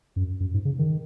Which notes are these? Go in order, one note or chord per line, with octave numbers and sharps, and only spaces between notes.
F#2
F#2
G#2
C#3
D#3